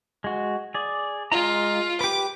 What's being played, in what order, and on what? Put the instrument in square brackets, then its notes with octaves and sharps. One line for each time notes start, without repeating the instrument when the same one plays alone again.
[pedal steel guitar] G#3 F#4
G#4 D5
[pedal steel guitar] G#3 A#5 [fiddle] F4
[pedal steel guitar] G4 B4 [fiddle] D6